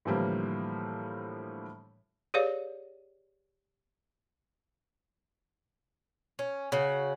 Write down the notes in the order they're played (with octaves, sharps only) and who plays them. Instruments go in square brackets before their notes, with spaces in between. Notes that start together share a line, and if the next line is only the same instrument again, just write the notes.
[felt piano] A2 D3 E3 F3 G3 A#3
[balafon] G4 G#4 B4 C#5 D5 F5
[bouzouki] C#4
C#3 F#4